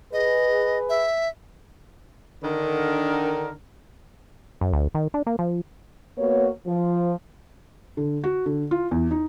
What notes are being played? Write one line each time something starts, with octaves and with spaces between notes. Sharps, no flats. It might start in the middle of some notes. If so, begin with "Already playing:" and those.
G#4 B4 D#5
E5
D3 D#3 A#4
F#2
D2
D#3
D4
A#3
F3
A#3 B3 F#4 C#5
F3
D3
F#4
D3
F4
E2
D#4